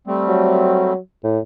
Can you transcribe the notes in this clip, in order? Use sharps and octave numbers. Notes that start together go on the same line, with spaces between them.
G3 A3 C4
F#3
A2